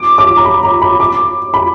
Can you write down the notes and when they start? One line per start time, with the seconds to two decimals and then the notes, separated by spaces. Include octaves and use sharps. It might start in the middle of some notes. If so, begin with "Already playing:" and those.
Already playing: D6
0.18 D6
0.37 A#5
0.45 B5
0.64 A#5
0.82 B5
1.00 D6
1.54 B5